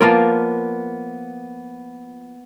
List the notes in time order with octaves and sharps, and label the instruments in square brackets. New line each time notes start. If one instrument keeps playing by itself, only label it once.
[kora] F3 F4 D5 [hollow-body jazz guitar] A#3 B3 A#4